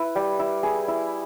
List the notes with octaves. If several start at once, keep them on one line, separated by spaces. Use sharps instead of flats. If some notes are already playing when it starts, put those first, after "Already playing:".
Already playing: E4 B4
G3
E4
G#4
E4